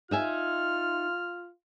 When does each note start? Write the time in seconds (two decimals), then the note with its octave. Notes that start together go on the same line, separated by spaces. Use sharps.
0.11 D#4 F4 E5 G#5 F6